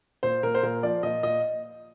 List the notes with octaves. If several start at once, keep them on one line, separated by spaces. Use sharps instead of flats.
A#2 C5
A#2 A#4
C5
A#2 A#4
F3 D5
A#2 D#5
A#2 D#5